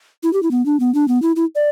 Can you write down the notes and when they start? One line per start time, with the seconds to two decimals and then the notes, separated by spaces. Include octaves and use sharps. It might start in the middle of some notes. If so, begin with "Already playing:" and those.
0.23 E4
0.33 G4
0.43 E4
0.51 B3
0.66 D4
0.80 B3
0.95 D4
1.08 B3
1.22 E4
1.36 E4
1.56 D5